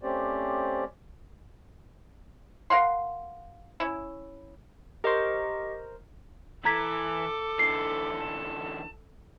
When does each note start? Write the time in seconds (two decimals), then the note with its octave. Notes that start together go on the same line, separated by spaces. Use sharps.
0.03 A3 C4 C#4 G4 C5 D5
2.70 A#4 F5 F#5 C6
3.80 C#4 E4
5.04 G4 A#4 C5 D#5 C#6
6.65 E3 A4 A#5 D6 G#6 B6
7.59 D3 E3 C7
8.18 A5